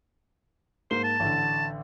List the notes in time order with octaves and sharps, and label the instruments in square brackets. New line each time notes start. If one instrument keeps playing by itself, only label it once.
[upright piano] G#2 A#3 G7 [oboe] C5
[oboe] A5
[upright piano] A1 D3